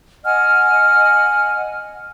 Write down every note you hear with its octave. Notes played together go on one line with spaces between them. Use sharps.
D#5 F#5 G#5 F6